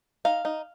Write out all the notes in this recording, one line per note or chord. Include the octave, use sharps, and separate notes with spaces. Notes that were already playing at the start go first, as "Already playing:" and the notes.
D#4 F5
D#4